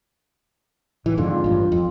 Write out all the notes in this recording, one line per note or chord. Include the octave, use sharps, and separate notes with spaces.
A2 E3
F2 G#2 D3 F4
F4
A1 G2
F2